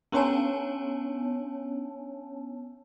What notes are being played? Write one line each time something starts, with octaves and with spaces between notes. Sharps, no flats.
B3 C#4 D4 C#5 G#5 A5